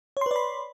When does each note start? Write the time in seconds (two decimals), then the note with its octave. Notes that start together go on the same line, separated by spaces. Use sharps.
0.17 C#5
0.21 C6
0.26 B4
0.31 D5
0.36 B5